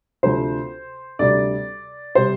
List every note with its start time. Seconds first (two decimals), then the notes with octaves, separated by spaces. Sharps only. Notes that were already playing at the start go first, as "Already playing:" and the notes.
0.23 D2 C3 F3 C5
1.19 D2 C3 G3 D5
2.15 C3 G3 C5